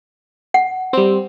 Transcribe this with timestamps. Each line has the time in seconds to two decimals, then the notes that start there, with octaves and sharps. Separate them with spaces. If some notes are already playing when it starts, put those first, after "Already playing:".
0.54 F#5
0.93 G3 C4